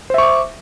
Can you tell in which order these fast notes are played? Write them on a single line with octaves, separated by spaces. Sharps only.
C5 E5 C#6 D6